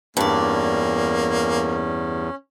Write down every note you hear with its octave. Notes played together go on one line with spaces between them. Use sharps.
E2 G2 A#3 C#4 D5